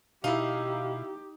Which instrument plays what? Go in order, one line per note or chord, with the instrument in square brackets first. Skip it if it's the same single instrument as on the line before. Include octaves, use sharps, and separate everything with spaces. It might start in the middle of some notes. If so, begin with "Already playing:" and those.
[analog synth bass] B2 [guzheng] D#4 [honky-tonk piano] E4 F5 [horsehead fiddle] G4